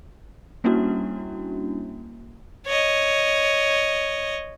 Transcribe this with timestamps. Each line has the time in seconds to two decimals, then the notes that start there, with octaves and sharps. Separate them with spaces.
0.64 G3 A#3 C#4 D4 E4 F#4
2.66 C#5 D#5